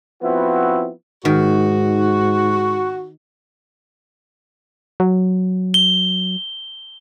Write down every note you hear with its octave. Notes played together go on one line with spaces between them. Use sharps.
F3 B3 C4 E4 F#4
G#2 D#3 F#4
F#3
G7